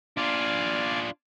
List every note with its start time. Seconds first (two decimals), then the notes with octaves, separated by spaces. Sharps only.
0.17 D4 F4 D5 F5 G#5